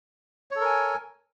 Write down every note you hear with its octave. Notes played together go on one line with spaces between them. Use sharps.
A4 A#4 C#5 G#5